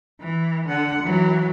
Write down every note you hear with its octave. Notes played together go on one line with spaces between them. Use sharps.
E3
D3 F#5
E3 F#3